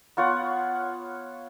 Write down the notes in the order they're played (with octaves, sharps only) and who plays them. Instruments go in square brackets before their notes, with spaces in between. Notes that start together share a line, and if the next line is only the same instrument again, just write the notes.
[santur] B3 F4 C#5 F#5